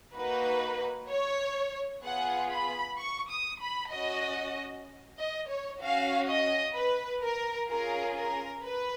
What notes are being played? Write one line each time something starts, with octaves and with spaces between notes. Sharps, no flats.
A#3 D#4 F#4 B4
C#5
B3 F4 G#4 F#5
B5
C#6
D#6
B5
C#4 F#4 D#5
D#5
C#5
C#4 F#4 F5
D#5
B4
A#4
C#4 F4 G#4 A#4
A#4
B4